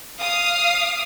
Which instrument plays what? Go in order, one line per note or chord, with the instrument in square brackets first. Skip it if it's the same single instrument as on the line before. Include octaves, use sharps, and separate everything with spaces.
[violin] F5 [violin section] D#6